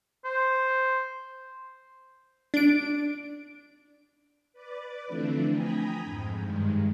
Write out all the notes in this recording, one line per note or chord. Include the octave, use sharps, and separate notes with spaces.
C5
D4 D7
B4 D5 D6
D3 E3 F3 A3 C4 D4
G5 G#5 A#5 B5 D#6
F2 G#2
G2 D#3 G#3